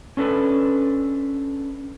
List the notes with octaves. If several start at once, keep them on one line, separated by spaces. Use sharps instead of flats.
C#4 D4 A4 B4